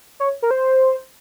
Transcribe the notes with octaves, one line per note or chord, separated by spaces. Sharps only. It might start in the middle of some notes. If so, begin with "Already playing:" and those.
C#5
A#4
C5